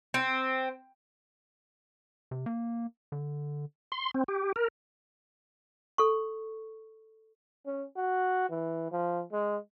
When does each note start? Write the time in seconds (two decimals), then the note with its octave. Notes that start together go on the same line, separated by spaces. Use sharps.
0.14 C4
2.31 C3
2.46 A#3
3.12 D3
3.92 C6
4.14 C4
4.28 G4
4.56 A#4
5.98 A4 C#6
7.66 C#4
7.96 F#4
8.50 E3
8.92 F3
9.32 G#3